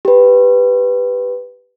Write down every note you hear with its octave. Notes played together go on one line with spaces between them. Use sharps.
G4 B4